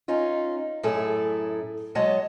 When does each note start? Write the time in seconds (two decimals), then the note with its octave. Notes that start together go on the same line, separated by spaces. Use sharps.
0.08 C#4 D#4 F4
0.83 F#2 A2 A3 E4 G#4 A4
1.95 F#3 G#3 C#5 D#5 F#5 A5